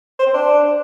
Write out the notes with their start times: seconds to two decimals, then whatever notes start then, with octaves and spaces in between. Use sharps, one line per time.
0.19 C5
0.26 C4
0.34 D4